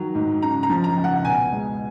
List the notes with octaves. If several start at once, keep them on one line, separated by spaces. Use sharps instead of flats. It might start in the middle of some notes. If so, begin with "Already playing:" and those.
Already playing: D#3 F#3
G#2
C#3 A#5
A#5
F3
A#5
C#2
F#5
B2 G#5
G#3